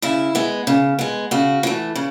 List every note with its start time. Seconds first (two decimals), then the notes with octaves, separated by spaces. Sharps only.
0.02 C#3 E4
0.35 G#3 B3
0.67 C#3
0.99 G#3 B3
1.31 C#3 F#4
1.63 E3 A3
1.95 C#3